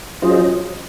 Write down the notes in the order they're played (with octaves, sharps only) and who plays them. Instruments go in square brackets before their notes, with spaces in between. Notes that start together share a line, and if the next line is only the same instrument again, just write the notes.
[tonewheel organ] F#3 C#4 G#4 C5 D#5 [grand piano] F4